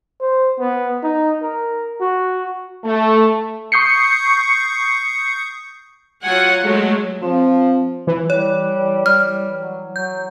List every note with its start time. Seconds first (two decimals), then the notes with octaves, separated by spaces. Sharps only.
0.21 C5
0.59 B3
1.03 D#4
1.42 A#4
2.01 F#4
2.84 A3
3.72 C#6 D#6 G6 C7 C#7
6.22 F#3 F4 F#5 G#5
6.63 F#3 G#3 A3
7.22 F3 C4
8.07 E3
8.30 G3 C#5
9.06 G3 F6
9.58 F#3
9.96 F#3 G6